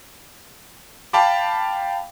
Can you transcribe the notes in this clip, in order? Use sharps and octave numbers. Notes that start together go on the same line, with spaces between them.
F5 G5 A5 B5 D6